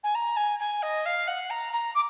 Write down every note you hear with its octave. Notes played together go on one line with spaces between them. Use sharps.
G#5
A#5
G#5
G#5
D#5
F5
F#5
A#5
A#5
D6